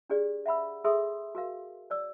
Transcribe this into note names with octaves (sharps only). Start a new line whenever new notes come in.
D4 G4 G#4 B4 D5
E5 F#5 B5 E6
G#4 A4 E5 C6 D#6 E6
F#4 A#4 F5
C#5 D5 E6